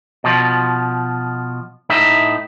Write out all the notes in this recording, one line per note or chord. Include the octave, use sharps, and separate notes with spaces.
B2 F3
A2 D#4 E5